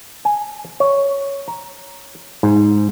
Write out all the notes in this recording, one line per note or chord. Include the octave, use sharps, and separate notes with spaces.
G#5
C#5
A#5
G#2